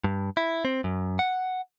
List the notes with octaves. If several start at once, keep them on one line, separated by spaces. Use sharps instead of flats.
G2
E4
C4
F#2
F#5